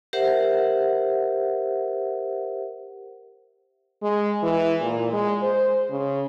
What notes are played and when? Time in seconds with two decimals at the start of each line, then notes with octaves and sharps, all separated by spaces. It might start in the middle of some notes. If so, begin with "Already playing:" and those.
0.13 G4 A#4 C5 E5 F#5
4.03 G#3
4.43 E3
4.81 A#2
5.13 G#3
5.43 C5
5.90 C#3